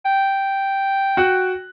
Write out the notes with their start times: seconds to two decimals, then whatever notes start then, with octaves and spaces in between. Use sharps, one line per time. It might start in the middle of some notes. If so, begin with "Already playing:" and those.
0.05 G5
1.17 F#4 F#6